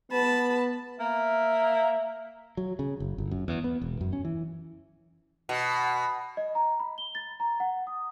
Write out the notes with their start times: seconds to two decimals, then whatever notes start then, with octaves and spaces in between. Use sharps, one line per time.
0.12 B3 A5 B5
1.00 A#3 E5
2.57 F#3
2.79 C#3
3.00 F#1
3.18 G1
3.31 F#2
3.48 E2
3.64 B3
3.82 E1
4.01 F#2
4.13 C#4
4.25 E3
5.49 B2
6.37 D#5
6.55 A#5
6.80 B5
6.98 G7
7.15 A6
7.40 A#5
7.60 F#5
7.87 D#6